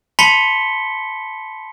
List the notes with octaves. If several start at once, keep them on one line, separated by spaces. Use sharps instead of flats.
A5 B5 C6 B6 C#7 G7